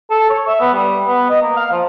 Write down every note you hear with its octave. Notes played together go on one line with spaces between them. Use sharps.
A4
C#5
E5
B3
G3
B3
D#5
A#3
F5
F3